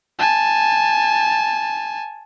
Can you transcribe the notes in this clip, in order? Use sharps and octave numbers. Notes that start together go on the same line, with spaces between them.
G#5 A5